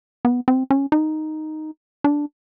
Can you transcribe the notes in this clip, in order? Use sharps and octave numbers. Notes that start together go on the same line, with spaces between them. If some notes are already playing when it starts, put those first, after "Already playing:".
B3
C4
C#4
D#4
D4